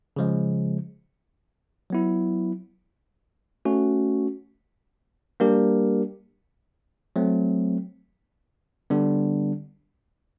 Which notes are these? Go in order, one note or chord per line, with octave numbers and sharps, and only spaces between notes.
C#3 F3 G#3
F#3 B3 E4
A3 C#4 F#4
G3 A#3 D4 G4 A#4
F#3 A3 C4
D3 G3 B3 D4